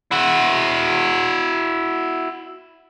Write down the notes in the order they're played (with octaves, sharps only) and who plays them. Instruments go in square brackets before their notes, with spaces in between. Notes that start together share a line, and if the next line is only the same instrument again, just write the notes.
[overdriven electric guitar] E4 F#4